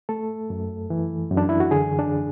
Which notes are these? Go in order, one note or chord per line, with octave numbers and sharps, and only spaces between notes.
A3 A4
F#2
E3
F#2
D4
E4
F#4
D3 G#4
D4